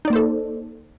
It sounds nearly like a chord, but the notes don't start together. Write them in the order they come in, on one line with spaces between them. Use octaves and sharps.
D#4 D5 A#3 C5 A4